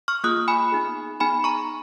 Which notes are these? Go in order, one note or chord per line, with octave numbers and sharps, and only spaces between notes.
C#6 F6
A#3 F4 G#4 D#6 F#6
G#5 B5
B3 D#4 G#4
B3 D#4 G#4 G#5 B5
A#5 C#6